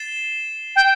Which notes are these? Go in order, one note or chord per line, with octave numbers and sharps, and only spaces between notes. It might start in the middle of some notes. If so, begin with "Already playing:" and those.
Already playing: A6 C7 E7 G7
G5